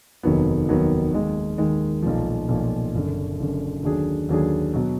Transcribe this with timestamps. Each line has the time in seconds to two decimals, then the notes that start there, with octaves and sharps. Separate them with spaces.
0.23 F1 D#2 D#3 F#3 B3
0.68 F1 D#2 D#3 F#3 B3
1.13 D#2 D#3 G#3
1.58 D#2 D#3 G#3
2.02 B1 A#2 F3
2.48 B1 A#2 F3
2.94 F#1 F#2 D3
3.39 F#1 F#2 D3
3.83 D#2 D3 F#3 D4 G#4
4.29 D#2 D3 F#3 D4 G#4
4.73 B2 F#3